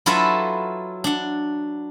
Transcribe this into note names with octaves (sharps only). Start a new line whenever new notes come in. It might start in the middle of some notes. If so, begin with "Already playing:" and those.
F#3 E4 F4 A4 B4 E5
D4 F#5